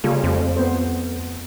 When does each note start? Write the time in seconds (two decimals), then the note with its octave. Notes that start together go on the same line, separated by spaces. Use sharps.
0.04 C#3 G3 A#3 F4
0.24 F2 A3 C4
0.57 B3 C5